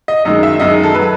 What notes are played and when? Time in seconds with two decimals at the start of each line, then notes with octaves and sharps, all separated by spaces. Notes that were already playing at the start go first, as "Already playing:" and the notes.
0.08 D#5
0.25 F#2 D#3 G#3 D#5
0.43 E5
0.60 F#2 D#3 G#3 D#5
0.83 A4
0.95 F#3 B4